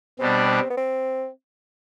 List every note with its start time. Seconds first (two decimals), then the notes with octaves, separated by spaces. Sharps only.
0.19 B2 G3 C4 D4
0.48 C4
0.70 B3
0.77 C4